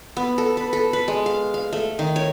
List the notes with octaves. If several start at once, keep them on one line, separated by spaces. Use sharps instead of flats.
B3
A4
B4
A4
B4
G#3
F5
F5
A3
D#3
C#5